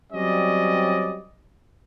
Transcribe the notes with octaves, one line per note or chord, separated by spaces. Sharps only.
F#3 G3 C4 C#4 D5 D#5